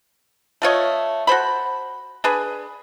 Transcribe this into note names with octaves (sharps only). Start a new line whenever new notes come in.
A3 F4 C#5 D#5
F#4 A4 C5 B5
D4 G#4 B4